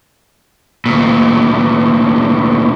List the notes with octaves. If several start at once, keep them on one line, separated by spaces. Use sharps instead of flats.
D2 A#2